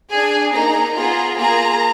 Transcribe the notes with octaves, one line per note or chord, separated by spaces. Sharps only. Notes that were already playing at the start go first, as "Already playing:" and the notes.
D4 G#4 G#5
A#3 D#4 G#4 A#5
B3 F4 G#4 A#5
A#3 F4 G#4 A#5